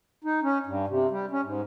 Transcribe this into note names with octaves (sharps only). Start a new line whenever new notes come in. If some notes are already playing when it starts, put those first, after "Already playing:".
D#4
C#4
G2
C3
G3
C#4
G#2